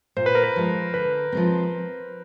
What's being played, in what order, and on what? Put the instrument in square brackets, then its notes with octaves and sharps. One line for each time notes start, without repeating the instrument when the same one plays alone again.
[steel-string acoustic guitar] A#2 [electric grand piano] C5
[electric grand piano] B4
A#4
B4
[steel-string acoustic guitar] F3 G#3
[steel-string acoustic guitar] D3 [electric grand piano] B4
[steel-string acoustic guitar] F3 G#3 C4